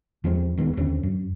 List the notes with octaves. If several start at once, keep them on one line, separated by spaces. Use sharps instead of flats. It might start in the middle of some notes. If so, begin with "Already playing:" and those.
E2 F3 G#3 C4
D#1 D#3 G#3 B3
D#2 D3 C4 C#4
F#2